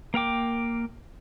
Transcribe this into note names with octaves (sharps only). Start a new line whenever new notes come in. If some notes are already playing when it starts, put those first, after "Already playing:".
A#3 A#4 G5 D6